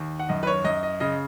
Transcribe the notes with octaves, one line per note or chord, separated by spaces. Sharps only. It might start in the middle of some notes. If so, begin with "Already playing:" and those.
Already playing: D#2
F#5
F#2 D#5
B4
C#5
F#2 D#5
D#5
C#3 D#5